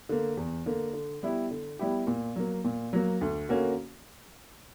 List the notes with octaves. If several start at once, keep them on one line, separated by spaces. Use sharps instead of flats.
D3 A#3
E2
D3 A#3
D3
G3 B3 E4 G4
D3
G3 B3 E4 G4
A#2
F#3 A#3
A#2
F#3 A#3
D2
D3 A#3 C#4 F#4